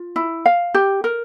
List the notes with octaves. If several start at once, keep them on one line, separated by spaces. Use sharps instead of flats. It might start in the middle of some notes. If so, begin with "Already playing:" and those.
Already playing: F4
E4
F5
G4
A#4